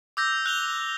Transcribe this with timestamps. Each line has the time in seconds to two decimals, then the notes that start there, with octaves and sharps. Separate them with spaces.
0.17 D6 E6 G6 A#6
0.46 F#6 F7 G7